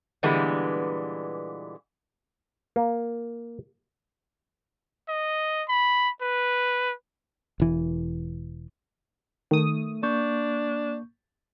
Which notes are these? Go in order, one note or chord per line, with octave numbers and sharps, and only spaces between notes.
A#2 D3 E3 G3 G#3 B3
A#3
D#5
B5
B4
E1 E3
D#3 A3 D#6
A#3 D4 C#6 G6